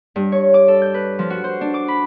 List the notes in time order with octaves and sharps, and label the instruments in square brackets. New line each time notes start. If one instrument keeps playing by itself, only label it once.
[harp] G2
C#5
D6
A4
G6
B4
F3
F#4
C5
D4
D6
B5